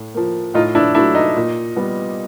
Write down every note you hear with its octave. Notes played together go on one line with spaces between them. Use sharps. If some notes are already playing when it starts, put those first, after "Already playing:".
Already playing: A2
F3 A#3
A2 D#4 F4
D4 E4
F#3 A3 D4 E4
D#4
A#2
G3 B3